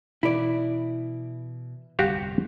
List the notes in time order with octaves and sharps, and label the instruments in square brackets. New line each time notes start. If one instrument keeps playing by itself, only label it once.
[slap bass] B2 E3 [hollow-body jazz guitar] E4 D5
[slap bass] G1 C2 F2 [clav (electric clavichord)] F#4 G4 F5